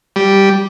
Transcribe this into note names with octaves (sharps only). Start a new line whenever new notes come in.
G3